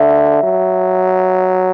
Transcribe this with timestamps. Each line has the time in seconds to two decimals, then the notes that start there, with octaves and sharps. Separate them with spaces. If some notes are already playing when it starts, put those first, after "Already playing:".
Already playing: D3 E5
0.43 F#3